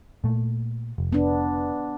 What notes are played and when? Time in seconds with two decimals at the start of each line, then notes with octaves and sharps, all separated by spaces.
0.24 A#2 A3
0.98 F1
1.12 B3 D4